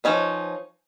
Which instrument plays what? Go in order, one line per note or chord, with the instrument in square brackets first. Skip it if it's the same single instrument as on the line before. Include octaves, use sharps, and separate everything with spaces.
[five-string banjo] F3 C4 C#4 D#4 B4